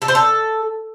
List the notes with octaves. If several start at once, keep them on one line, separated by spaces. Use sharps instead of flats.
A4
C5
A4